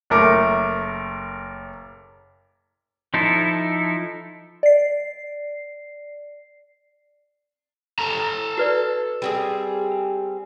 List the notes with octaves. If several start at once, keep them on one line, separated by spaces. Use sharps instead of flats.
F#1 A3 A#4 D6
F3 D#4 E4 A4
D5 C7
A4 A#5
F#4 B4 D5
G3 C4 G#4